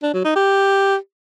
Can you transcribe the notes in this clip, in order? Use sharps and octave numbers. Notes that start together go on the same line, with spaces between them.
D4
F#3
D#4
G4